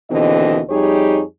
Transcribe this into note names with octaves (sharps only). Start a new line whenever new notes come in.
D#2 B2 D3 E3 C4 D#5
F2 G3 D#4 G4 G#4 C#5